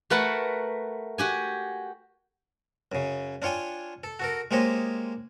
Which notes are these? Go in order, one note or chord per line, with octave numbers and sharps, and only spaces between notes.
A3 F#4 A#4 B4 F#5 A5
F#4 G4 G#5
F#2 C#3
D4 F4 C#5 G5 G#5
A4
F#4 A4 A#4
G#3 A#3 G4 C5 C#5 D#5